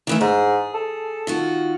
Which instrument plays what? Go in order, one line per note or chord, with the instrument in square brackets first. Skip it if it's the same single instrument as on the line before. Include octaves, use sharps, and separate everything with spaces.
[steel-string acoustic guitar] D#3 E3 A3
[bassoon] G#2 [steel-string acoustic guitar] G#4
[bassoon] A4
[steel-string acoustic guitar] D#3 F4 F#4